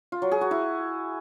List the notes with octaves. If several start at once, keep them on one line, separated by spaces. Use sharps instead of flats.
F4
F#3
G#4
F#4
E4